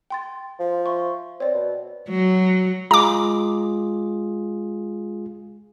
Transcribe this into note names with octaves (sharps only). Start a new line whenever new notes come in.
G5 C6 A6
F3
E5 C6 C#6
C4 C#5 D5
B2
F#3
G#3 F4 G#4 A#5 D6